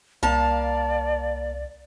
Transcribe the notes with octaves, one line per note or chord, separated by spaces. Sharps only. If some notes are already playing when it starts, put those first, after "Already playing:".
C2 A#3 D5 F5 A5